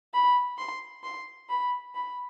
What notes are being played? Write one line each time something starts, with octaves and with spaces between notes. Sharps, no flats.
B5
C6
C6
B5
B5